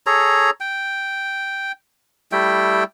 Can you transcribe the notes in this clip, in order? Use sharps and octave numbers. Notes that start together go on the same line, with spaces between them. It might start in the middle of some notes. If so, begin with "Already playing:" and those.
G#4 A4 C#5 A#5
G5
G3 A3 E4 G5